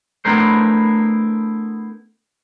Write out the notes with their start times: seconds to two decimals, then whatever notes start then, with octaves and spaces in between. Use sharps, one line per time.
0.25 A3 B3 D4 E4 A#4 C5